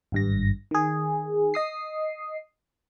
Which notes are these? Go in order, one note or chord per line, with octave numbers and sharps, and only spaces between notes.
G#1 G2 A#6
D#3 G#4
D#5 D#6 C7